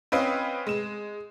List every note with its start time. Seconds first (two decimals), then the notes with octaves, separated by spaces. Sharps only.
0.12 C4 C#4 B4 D#5 F5
0.67 G#3 E7